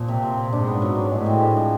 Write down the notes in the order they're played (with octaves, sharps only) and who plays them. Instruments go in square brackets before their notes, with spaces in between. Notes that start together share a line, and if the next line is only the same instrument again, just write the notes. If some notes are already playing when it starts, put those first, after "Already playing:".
Already playing: [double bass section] A#2 [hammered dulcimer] F3
[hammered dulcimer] C3
C4
C3
[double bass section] G#2 [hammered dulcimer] D4
[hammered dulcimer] B3
F#3
D4
[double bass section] A2 [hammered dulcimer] G#3
[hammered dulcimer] C4
G#3
F3